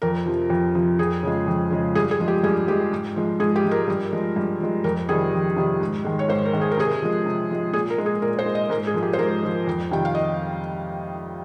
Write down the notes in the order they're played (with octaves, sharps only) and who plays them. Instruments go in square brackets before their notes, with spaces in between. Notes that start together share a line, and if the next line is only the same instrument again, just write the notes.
[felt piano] F2 A#4
C3 F3
F2
C3 F3
F2 G#4
C#3 F3 G#3
F2
C#3 F3 G#3
G2 G#4
G#4
F3 G#3
G4
G2 G#4
F3 G#3 G4
G#2
F3 G#3
G#2 G#4
G4
F3 G#3
A#4
G2
F3 G#3
G2
F3 G#3
F2 A#4
C3 D#3 G3 G#4
F2
C3 D#3 G3
G#2
D#3 G#3
C#5
G#2 C5
A#4
D#3 G#3
G#4
A#4
C3 G#4
F3 G#3
C3
F3 G#3
A#2 G#4
A#4
G#3
G#4
A#2 A#4
C5
G#3
D#5
G#2 A#4
G#4
F3 G#3
G4
C5
G#2 A#4
F3 G#3
F2
C3 D#3 G3 G5
F5
D#5